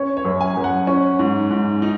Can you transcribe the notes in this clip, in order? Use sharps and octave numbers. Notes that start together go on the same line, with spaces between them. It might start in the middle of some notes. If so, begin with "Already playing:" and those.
Already playing: C#4 C#5
C#5
F#2
G#5
F#2
F#5
C#4
G#2
G#2
D#4